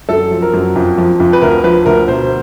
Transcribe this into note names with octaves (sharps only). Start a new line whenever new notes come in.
F#2 A4
F3
A#4
F#2
F2
F3
F2
B4
D2 A#4
F3 B4
D2 A#4
B2 C5